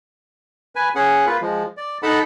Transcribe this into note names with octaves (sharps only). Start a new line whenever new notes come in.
B4 G#5
C#4 G#4 F#5
A#3 F4 B4
F3 G#3
D5
D#4 A4 F#5 A5 B5